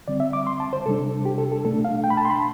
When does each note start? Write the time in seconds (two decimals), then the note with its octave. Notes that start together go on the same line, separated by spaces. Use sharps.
0.08 D3 G3 C4 D5
0.20 E5
0.33 D6
0.47 C6
0.60 A5
0.73 C5
0.86 C3 G3 D4 A4
1.25 G4
1.38 A4
1.52 A4
1.64 B2 A3 D4 A4
1.85 F5
2.04 G5
2.10 B5
2.17 A5
2.25 C6
2.30 B5